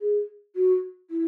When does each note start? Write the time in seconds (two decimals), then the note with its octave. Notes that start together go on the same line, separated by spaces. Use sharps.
0.01 G#4
0.55 F#4
1.10 E4